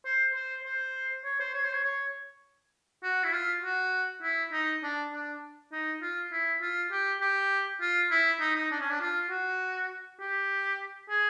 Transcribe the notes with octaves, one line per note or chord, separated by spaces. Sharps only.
C5
C5
C5
C#5
C5
C#5
C5
C#5
C#5
F#4
E4
F4
F#4
E4
D#4
D4
D4
D#4
F4
E4
F4
G4
G4
F4
E4
D#4
D#4
D4
C#4
D4
F4
F#4
G4
G#4